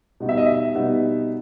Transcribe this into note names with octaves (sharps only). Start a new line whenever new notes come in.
B2 G3 B3 D#4
E5
D#5
E5
B2 G3 B3 D#4